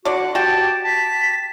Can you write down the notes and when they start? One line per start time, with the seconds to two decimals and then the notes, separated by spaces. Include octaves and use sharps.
0.05 D3 F#4 D5 F#5
0.35 F#4 G4 G5 A5
0.85 A5 B6